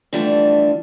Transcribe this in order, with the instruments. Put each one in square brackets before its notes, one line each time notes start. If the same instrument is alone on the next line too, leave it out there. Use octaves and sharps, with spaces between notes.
[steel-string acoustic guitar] D3 E3 F3 G3 A3 D4